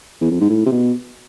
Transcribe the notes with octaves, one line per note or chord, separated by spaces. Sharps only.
E2
F2
G#2
A2
C3
B2